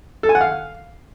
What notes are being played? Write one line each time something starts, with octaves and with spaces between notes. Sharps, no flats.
A4
G#5
F#5
F5